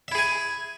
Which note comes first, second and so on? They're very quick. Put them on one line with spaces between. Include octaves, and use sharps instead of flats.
E5 E4 G#4 G#5